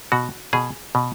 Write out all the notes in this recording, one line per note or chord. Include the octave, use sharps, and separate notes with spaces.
B2 F#4
B2 G#4
B2